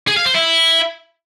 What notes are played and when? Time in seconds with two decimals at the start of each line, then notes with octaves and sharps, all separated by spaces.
0.08 G#4
0.16 F5
0.25 C5
0.34 E4